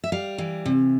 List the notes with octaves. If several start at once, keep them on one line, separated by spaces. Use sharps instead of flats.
E5
G3 F5
E3
C3